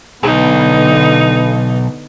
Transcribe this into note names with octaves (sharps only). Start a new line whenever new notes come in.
B1 D3 B3 D#4